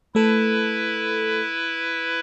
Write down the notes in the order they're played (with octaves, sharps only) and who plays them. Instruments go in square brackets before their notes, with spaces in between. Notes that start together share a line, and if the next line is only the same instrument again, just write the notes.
[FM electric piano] A3 A4 [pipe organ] E4 B4